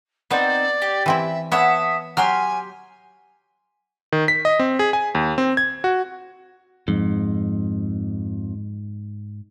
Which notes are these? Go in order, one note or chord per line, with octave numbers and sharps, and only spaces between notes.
B3 C4 D#4 C5 D5
G4
E3 C4 E4 E5
B3 C#5 E5 F#5 A5 D#6
F#3 G4 G#5 C6 F6
D#3
B6
D#5
C4
G#4
G#5
D#2
C4
G#6
F#4
F2 G#2